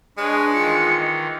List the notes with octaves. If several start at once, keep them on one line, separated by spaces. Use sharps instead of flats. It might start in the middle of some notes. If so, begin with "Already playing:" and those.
G#3 D4 B4 C#5
D#3 E3 F4 C#7